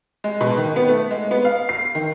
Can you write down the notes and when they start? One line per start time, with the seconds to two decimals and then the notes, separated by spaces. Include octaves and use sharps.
0.24 G#3
0.41 B2
0.57 D#3
0.76 B3
0.89 A3
1.11 G#3
1.31 B3
1.45 F5
1.69 C7
1.95 D#3